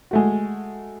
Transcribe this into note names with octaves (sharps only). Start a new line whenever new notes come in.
G#3 A3 F#4